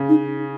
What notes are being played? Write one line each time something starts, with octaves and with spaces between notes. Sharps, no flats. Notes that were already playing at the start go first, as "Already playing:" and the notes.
Already playing: C#3
D#4